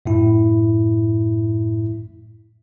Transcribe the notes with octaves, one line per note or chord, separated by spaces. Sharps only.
F#2 A2 E4